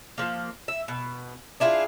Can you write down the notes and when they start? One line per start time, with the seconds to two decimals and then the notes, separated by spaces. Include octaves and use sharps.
0.18 F3 A#3
0.68 E5
0.88 B2
1.60 D4 E4 F4 G#4